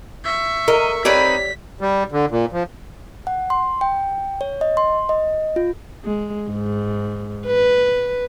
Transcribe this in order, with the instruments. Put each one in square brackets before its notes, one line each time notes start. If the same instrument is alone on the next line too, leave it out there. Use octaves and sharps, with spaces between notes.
[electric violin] E5 C#6
[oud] A#4 [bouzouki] D#5
[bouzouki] C4 D#4 B4 [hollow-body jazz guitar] G4 C#5 D5 [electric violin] B6
[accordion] G3
D3
A#2
F3
[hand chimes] F#5
C6
G5
C#5
D#5
C6
D#5
F4
[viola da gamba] G#3
G#2
B4